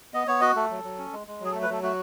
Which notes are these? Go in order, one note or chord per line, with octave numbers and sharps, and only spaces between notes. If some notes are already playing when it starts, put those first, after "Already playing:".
B3 D#5
B3 C#5
F#4 D#5
A3 A4
F#3
F#3
C#4
G#3
G#3
F#3 G#4
A4
A3
B4
F#3 A4
A3 F#4